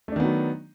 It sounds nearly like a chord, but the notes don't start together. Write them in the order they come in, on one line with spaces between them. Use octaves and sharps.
A3 D4 D#3 B3 F#3